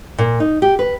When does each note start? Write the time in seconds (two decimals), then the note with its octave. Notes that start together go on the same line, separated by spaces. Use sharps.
0.18 A#2
0.40 D#4
0.62 G4
0.79 B4